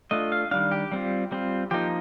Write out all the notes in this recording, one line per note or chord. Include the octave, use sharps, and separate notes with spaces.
A3 D4 F4 D#5
F5
D#3 G3 D4 F5
G4
G3 C4 F4
G3 C4 F4
F3 A#3 D#4 G4